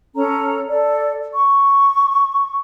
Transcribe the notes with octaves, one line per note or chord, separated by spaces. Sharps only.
C#4 A4 A#5
A4 D5
C#6